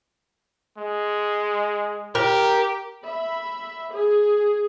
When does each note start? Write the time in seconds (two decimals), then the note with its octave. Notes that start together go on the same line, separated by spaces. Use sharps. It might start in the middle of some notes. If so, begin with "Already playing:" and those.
0.78 G#3
2.15 G4 A#4
3.05 E5 B5
3.93 G#4